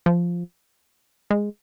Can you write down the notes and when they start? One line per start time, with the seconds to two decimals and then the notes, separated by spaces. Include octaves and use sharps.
0.06 F3
1.31 G#3